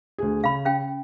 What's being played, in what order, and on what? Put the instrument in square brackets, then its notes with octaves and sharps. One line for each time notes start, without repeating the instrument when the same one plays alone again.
[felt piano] D2 G#4
[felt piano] C#3 [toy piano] F5 B5
[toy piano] C#4 F5 G5